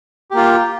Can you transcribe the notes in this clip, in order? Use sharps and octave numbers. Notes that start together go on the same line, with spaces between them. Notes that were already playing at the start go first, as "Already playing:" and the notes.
A#3 F4 G4